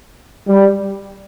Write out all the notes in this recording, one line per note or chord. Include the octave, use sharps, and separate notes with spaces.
G3